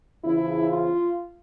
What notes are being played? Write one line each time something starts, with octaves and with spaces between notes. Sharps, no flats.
E2 C#3 F3 E4
F4